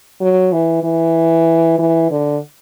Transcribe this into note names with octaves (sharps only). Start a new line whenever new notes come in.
F#3
E3
E3
E3
D3